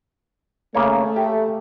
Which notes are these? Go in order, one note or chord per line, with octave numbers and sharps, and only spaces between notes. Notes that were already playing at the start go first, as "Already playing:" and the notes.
C#3 A3 A#3 C#5
G4